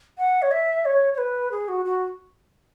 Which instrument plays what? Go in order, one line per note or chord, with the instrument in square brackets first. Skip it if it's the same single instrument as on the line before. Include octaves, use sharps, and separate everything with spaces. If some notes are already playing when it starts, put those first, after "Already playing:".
[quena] F#5
C#5
E5
C#5
C#5
B4
G#4
F#4
F#4